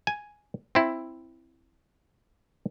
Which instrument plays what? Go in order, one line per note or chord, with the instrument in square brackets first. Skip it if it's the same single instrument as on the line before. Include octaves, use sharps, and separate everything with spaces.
[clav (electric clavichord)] G#5
C4 E4